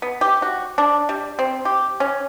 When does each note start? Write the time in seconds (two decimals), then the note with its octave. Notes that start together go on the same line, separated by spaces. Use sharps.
0.02 B3
0.21 G4
0.42 F#4
0.78 D4
1.09 G3
1.39 C4
1.65 G4
2.00 C#4